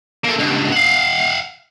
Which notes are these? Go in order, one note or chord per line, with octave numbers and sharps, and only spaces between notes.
A#3 A4
C#2 G2
F5 F#5